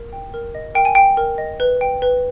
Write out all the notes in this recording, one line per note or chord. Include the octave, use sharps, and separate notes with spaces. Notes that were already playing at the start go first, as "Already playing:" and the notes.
Already playing: A#4
G5
A#4
D#5
A#4 G5
G#5
G5
A#4
D#5
B4
G5
B4